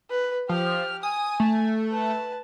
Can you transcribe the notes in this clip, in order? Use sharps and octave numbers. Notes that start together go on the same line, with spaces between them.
B4
F3 G4 F6
G#5 D#6
A3
B4 A5